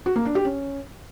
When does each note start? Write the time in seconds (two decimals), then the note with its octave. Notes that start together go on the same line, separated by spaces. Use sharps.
0.06 F#4
0.16 A#3
0.25 D4
0.35 G4
0.45 C#4